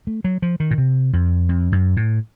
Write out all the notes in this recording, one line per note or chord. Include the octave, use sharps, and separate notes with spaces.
A3
F#3
F3
D#3
A#2
C3
F2
F2
F#2
A2